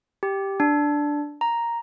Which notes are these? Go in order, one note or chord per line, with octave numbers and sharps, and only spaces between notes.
G4
D4
A#5